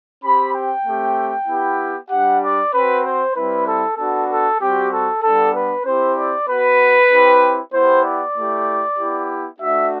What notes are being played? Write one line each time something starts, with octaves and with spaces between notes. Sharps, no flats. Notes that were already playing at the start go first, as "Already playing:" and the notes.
C4 G4 B5
G5
A3 C4 G4
B3 E4 G4
G3 D4 G4 F#5
D5
C4 F#4 B4
C5
G3 C4 E4 B4
A4
B3 D4 F#4 A4
A4
G3 C4 F#4 G4
A4
G3 B3 D4 A4
B4
C4 E4 G4 C5
D5
B3 F#4 B4
C4 E4 G4
B3 E4 G4 C5
D5
A3 E4 G4
B3 E4 G4
A3 D4 F#4 E5